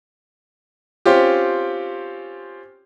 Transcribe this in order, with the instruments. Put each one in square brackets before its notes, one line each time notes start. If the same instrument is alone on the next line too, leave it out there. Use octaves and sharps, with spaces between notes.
[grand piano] C4 C#4 F4 G4